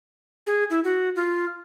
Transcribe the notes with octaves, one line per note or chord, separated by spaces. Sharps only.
G#4
E4
F#4
F4